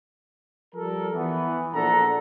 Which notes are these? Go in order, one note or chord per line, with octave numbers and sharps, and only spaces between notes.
F3 G3 A4 A#4
E3 B3
A#1 D4 A4 F#5 A#5